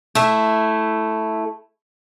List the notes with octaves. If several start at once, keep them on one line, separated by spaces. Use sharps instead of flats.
A3 E4